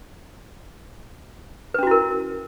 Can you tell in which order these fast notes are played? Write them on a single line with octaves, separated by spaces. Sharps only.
B4 C#4 F#4 E4 A#4